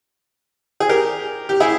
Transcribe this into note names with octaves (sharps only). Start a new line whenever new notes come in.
G#4
G4 A#4
G4
E4 G#4